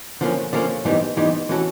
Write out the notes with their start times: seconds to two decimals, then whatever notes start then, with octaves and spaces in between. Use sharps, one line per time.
0.21 D3 F3 A#3 C#4
0.53 D3 F3 A#3 C#4
0.85 G#2 E3 G3 B3 D#4
1.17 G#2 E3 G3 B3 D#4
1.49 E3 A3 C#4 F#4 A4